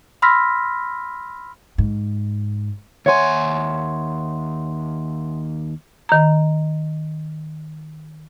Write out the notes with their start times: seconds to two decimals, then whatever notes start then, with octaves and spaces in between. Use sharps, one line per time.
0.22 B5 C6 E6 F6 A#6 B6
1.78 G#2
3.06 D#2 C#5 E5 F#5 G#5 C6
6.09 D#3 A#5